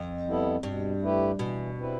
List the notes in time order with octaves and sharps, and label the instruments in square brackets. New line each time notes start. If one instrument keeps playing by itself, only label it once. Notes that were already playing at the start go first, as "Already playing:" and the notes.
Already playing: [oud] F2
[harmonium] G3 B3 E4 A4
[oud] G2 [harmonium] B2
[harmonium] A3 E4 G4 B4
[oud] B2 [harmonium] E3
[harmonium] G3 C4 E4 B4